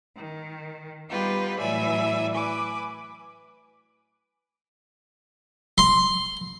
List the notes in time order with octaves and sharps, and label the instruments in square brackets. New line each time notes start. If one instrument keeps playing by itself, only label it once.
[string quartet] D#3
G3 B3 D#4 F4 G4 B4
A2 E3 F#3 D5 E5 G#5
B4 G#5 D6
[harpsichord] C6